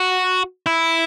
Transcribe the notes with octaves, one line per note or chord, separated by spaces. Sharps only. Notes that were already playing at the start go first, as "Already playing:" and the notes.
Already playing: F#4
E4